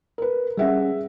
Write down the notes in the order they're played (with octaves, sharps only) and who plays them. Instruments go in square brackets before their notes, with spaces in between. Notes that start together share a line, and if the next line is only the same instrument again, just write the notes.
[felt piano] A#4 B4
[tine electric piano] G3 C#4 [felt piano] G#4 E5 F#5